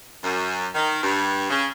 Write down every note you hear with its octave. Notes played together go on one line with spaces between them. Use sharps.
F#2
D#3
G2
C#3